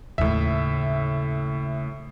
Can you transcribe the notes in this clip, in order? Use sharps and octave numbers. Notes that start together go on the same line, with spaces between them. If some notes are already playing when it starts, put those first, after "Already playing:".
D#2 A2 C#3 E5